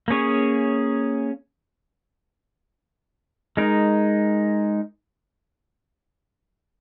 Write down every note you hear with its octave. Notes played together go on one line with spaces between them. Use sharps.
A#3 C#4 G#4 C#5
G#3 D#4 A#4